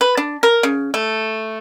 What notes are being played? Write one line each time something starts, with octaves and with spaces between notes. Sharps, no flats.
B4
D4
A#4
C#3
A3